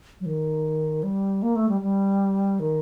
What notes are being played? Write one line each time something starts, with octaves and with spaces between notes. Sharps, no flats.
F#3
D#3
G3
A#3
A3
G3
G3
D#3